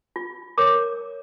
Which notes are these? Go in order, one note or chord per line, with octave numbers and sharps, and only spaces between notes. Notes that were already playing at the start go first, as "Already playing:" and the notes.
F4
A#4 C#5 D6